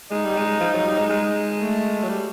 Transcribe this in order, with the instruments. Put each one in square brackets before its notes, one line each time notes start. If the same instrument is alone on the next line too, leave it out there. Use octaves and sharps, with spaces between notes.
[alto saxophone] G#3 [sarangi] D#4
[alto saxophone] G3
G#3
F3
F#3
G3
G#3
G#3
[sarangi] A3
[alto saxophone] F#3
G3